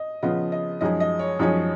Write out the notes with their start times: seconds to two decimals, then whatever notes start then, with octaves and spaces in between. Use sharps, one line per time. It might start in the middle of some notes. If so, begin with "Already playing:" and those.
Already playing: D#5
0.23 C#3 F3 B3 F4 D#5
0.52 D#5
0.81 F#2 F3 G#3 D#4 G#4 D#5
1.00 D#5
1.19 C#5
1.39 F#2 F3 G#3 D#4 G#4 C#5